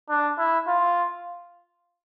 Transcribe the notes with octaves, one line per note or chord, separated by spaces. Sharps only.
D4
E4
F4